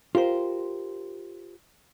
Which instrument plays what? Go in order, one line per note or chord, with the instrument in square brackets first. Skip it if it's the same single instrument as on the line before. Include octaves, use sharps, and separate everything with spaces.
[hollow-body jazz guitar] F4 G4 A#4 C5